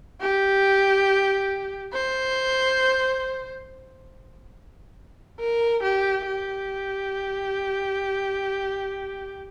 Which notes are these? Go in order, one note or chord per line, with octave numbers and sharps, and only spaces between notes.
G4
C5
A#4
G4
G4